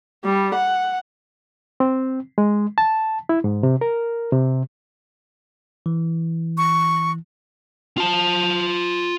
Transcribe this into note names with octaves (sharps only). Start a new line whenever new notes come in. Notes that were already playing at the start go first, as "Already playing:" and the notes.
G3
F#5
C4
G#3
A5
E4
G#2
C3
A#4
C3
E3
C#6
F4 A5